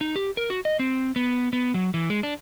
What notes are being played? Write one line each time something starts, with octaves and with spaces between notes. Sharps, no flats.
D#4
G4
A#4
F#4
D#5
C4
B3
B3
F#3
E3
G#3
D4